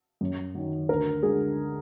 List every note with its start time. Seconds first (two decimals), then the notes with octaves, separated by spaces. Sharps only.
0.21 F#2
0.55 D#3 F#3
0.89 D2 A#4
1.23 D3 G#3 G#4